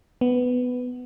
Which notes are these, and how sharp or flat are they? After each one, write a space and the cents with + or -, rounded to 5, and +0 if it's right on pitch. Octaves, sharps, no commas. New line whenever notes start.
B3 +10